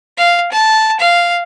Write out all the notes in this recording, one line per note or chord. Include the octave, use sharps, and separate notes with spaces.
F5
A5
F5